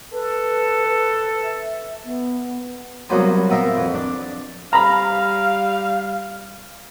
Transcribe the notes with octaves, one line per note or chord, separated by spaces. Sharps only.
A4 B4
B4
E5
B3
C2 F#3 A#3 B3 C5 G#5
B3 A#4 E5 F5 G5
F2
D4
G3 F5 A#5 B5